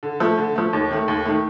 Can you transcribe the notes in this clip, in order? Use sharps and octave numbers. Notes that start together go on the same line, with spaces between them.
D3
F3 A3
D3
F3 A3
D#2
D#3 A3
D#2
D#3 A3